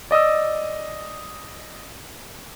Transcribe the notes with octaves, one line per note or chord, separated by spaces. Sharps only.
D5 D#5 D#6 E6